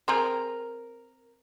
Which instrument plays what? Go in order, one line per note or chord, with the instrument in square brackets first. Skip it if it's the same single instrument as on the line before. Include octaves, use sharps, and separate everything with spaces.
[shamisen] C4 G#4 C5 [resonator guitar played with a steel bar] A#4